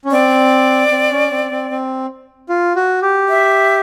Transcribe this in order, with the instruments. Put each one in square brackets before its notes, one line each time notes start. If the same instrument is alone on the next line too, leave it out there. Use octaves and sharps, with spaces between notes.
[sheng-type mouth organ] C#4
[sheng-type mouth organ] C4 [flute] D5
[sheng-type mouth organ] C4
C#4
C4
C4
C4
F4
F#4
G4
[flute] E5